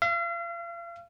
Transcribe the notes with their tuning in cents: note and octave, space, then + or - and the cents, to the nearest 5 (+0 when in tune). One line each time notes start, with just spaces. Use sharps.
F5 -40